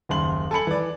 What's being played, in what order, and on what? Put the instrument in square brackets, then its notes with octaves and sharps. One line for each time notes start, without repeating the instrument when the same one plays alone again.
[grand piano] F#1 D#2 C#3 C6 F#7
A4 G#5 B5 C#7 F#7
E3 D5